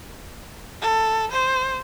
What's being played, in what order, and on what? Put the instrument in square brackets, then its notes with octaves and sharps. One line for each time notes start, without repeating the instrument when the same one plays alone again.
[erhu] A4
C5